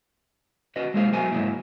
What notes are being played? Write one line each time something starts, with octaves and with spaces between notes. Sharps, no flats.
C#4 F#4 B4 D#5
G#3 A#3 D#4 G#4 C5 F5
F#3 B3 F#4 A#4 C5 G#5
G#2 C#3 F#3 G#3 A#3 E4